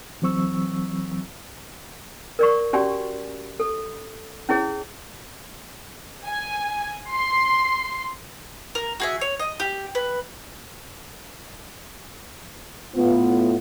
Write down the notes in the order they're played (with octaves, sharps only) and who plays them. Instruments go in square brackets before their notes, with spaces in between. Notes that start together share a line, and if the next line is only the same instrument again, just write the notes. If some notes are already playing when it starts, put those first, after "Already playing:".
[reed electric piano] E3 F#3 C4 C#6 E6
[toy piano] A#4 D5 C#6
C#4 F#4 G4 D5 G#5
A4
C#4 E4 G#4 C#5
[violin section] G#5
C6
[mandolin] A#4
F#4 G#4 E5
C#5
D#5
G4
B4
[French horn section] A2 B3 F4